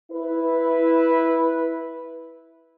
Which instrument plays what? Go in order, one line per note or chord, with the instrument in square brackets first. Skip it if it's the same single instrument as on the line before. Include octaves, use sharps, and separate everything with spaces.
[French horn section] E4 B4